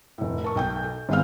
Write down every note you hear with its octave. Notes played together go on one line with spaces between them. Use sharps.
F1 A2
A#4 A5 C#6
B1 G5 G6
A4
G#1 D#3 G#3 B3 F5 F6